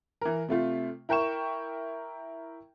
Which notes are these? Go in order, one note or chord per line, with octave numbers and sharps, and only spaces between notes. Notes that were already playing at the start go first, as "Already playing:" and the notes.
E3 A#4
C3 A3 F4
E4 A#4 G5 C#6 E7